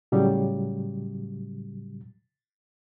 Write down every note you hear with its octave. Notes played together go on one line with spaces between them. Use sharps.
A2 C#3 F#3 G3